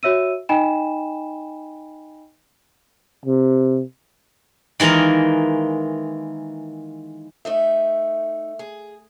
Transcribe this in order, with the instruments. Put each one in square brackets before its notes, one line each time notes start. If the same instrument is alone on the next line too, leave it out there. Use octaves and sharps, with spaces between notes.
[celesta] F#4 C#5 E5 E6 D#7
D#4 D#5 G5 G#5 B5 E7
[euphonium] C3
[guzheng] D#3 E3 G#3 A#3 A#4
[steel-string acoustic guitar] A3 D#4 E5
G#4